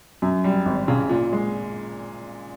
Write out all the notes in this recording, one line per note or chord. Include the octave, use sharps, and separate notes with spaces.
F#2
G3
G#1
C#3
A#2
G#3